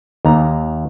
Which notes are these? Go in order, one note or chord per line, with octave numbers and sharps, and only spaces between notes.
D#2 A#5